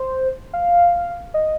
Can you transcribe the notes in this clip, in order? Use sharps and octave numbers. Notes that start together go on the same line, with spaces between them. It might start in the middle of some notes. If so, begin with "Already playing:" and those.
Already playing: C5
F5
D#5